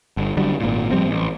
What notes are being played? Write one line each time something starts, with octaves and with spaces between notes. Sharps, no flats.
G1
D3 F#3 G3
G#1 A#2
F3 G3 C4
A1